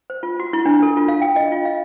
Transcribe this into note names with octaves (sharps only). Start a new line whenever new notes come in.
C5
F4
F#4
E4
D4
A4
F4
F5
G5
D#5
F4
F5